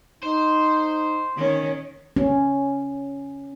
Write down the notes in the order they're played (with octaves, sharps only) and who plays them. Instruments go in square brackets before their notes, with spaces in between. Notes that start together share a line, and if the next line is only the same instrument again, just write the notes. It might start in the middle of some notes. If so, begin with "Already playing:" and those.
[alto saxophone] D#4 [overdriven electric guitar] C5
[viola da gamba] D#3 C#4
[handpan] C#4